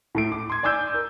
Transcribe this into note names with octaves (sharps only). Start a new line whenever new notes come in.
A2 A3 D7
D6
C6 G#6
D5 G#5 D6 E6 G6
A#4